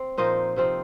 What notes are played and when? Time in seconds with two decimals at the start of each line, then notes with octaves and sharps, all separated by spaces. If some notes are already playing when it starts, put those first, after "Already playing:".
Already playing: C4
0.18 A#2 F3 A#3 D#4 C5 D#5
0.56 C3 F3 C4 D#4